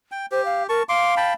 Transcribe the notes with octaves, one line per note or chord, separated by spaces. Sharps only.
G5
G4 C5
F5
A#4 A5 C#6
F5 C6 D6
G5 A5 B5